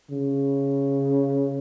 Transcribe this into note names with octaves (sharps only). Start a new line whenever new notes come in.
C#3